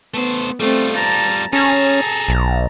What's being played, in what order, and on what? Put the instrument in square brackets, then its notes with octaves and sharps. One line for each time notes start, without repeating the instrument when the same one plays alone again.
[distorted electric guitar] A3 C5 [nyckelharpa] B3
[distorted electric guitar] G3 F4 [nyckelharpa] A3 C4
[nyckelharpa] A5 A#5
[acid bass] C#4 [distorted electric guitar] G#4 A4 [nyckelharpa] A5 A#5
[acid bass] B1